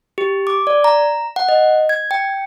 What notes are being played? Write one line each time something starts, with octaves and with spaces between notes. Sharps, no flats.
G4
D6
D5
A#5
F#5
D#5
G#6
G5